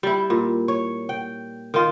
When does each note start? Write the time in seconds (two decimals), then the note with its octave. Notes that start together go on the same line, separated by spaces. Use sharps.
0.03 G3 E4
0.30 A#2
0.68 C#5
1.09 G5
1.74 D#3 F4